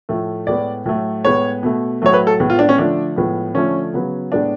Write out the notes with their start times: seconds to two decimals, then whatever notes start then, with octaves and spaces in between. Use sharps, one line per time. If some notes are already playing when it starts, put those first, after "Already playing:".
0.09 A2 F3 A3
0.47 A2 G#3 B3 D5
0.86 A2 F#3 A3
1.25 A2 G#3 B3 C#5
1.63 B2 A3
2.02 A2 F#3 A3 C#5
2.14 B4
2.27 A4
2.40 A2 G#3 B3
2.50 F4
2.59 D4
2.69 C#4
2.78 D3 F3 A3 D4
3.16 A2 F3 G#3 B3
3.54 D3 F3 A3 C#4
3.94 C#3 F#3 B3
4.32 A2 G#3 B3 D4